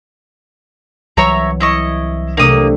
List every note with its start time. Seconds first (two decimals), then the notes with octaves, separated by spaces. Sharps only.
1.17 C2 E3 F#3 C#5 E5 A#5
1.61 E4 D#5 C#6
2.37 C3 A3 A#3 D4 D#6